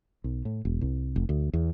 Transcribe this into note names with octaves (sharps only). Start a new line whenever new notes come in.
B1
A2
E1
C2
F1
D2
E2